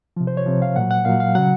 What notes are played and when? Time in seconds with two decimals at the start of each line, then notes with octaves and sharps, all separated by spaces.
0.17 C3 F3
0.27 C5
0.37 C#5
0.46 C3 F3
0.62 F5
0.76 A#2 F#3 F#5
0.91 F#5
1.05 A#2 F#3 F5
1.20 F5
1.35 C#3 F#3 F#5